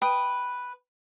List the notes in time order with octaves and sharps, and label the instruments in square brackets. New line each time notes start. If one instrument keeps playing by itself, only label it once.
[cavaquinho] B4 G5 D#6